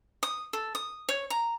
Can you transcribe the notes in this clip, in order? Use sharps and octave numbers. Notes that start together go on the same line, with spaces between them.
D#6
A4
D#6
C#5
A#5